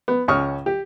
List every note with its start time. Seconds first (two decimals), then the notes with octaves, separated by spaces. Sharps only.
0.08 B3
0.28 C#2 C#4 C#6 D#6 F6
0.66 G4